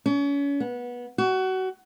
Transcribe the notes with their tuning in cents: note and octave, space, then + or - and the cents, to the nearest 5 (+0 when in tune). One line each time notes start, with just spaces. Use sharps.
C#4 +35
B3 -20
F#4 +25